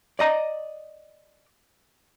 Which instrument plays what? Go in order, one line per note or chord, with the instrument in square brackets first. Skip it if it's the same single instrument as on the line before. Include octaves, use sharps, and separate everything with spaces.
[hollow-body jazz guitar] D5 D#5 A#5